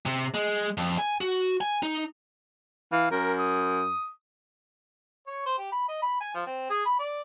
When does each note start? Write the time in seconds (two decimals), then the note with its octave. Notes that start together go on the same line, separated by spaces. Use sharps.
0.06 C3
0.34 G#3
0.77 F2
0.98 G#5
1.21 F#4
1.61 G#5
1.83 D#4
2.92 E3 F5
3.11 F#2 A#4
3.39 D#6
5.27 C#5
5.46 C5
5.58 G4
5.72 B5
5.88 D#5
6.02 B5
6.20 G#5
6.34 F3
6.47 C4
6.70 G#4
6.86 B5
6.99 D5